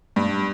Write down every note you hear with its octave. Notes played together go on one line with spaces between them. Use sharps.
G2